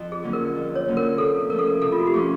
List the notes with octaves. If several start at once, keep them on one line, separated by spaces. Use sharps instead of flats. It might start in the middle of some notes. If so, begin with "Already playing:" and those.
Already playing: F2
G#4
D3 F#3 A#3 C#4
A#4
F2
C#5
D3 F#3 A#3 C#4
A#4
C3 A4
F3 A3 C#4 A#4
A4
A#4
C3 A4
F4
F#4
G4
F3 A3 C#4 G#4